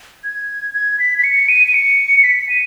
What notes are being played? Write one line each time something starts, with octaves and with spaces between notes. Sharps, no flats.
G#6
G#6
B6
B6
C#7
D#7
D#7
C#7
B6
D#7